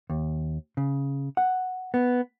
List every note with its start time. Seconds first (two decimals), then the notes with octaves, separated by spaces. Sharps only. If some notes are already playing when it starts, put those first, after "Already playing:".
0.10 D#2
0.77 C#3
1.37 F#5
1.94 B3